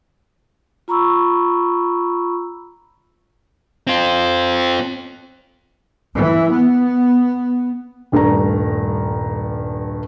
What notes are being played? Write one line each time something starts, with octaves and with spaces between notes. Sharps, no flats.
F4 A#5 B5 C#6 E6
C4 F4
E3
B3
D#1 G2 A3 D4 A#5